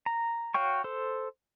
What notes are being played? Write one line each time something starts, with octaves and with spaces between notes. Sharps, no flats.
A#5
F#4 C#5 F5 G5 C#6
A4 C5